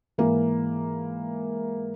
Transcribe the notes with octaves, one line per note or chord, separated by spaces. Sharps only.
G#2 E3 A#3